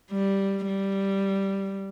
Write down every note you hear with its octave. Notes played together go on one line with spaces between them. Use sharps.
G3
G3